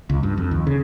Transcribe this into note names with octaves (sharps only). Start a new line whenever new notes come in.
C#2
G2
F2
D#2
C#3